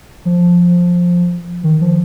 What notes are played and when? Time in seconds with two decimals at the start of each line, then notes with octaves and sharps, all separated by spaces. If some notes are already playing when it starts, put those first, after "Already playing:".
0.25 F3
1.63 D#3
1.81 F3